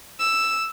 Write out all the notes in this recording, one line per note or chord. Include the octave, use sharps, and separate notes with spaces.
E6